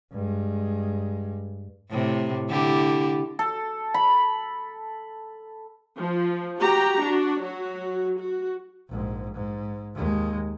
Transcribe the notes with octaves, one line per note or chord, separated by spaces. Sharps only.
G2 G#3
A2 C3
D3 E4 G4
A4
B5
F3
F#4 G4 A#5
D4 F#4
F#3 F#4
F#4
A#1 G#2
G#2
D#2 G#3